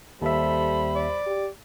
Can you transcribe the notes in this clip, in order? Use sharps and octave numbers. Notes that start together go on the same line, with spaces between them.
D#2 G3 A4 C5 E5 B5
D5
G4